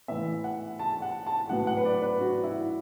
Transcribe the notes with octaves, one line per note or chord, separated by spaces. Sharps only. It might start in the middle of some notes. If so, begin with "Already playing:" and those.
A2 E3 B3 E5
F#5
A5
F#5
A5
A2 F#3 B3 F#5
F#5
B4
D5
B4
F#4
E4